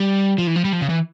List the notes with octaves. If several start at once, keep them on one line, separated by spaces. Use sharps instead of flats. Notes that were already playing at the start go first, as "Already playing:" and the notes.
Already playing: G3
F3
E3
F3
G3
F3
C#3
E3